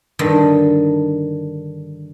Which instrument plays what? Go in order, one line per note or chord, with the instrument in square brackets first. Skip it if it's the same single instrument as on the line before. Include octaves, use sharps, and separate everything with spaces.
[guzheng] G2 D3 D#3